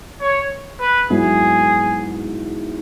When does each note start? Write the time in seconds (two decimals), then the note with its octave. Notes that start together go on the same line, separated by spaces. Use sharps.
0.21 C#5
0.80 B4
1.10 G#2 F#3 B3 E4 G#4